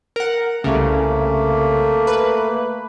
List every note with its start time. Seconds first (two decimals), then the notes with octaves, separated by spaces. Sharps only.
0.16 A#4 F#5
0.64 C2 C#3 A3 A#3
2.07 B4